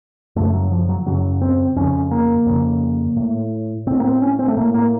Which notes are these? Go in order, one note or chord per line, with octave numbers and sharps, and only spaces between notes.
F#2 C#3 A3
F#3
F3
F#3
F#2 C#3 F#3
C4
F2 C#3 C#4
A#3
F2 C#3
A2
A2 C4
A#3
C4
C#4
C4
A3
A2 A#3
A#3